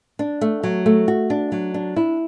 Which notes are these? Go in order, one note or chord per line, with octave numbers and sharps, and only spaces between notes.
D4
A3
F#3
A3
F#4
D4
F#3
D4
E4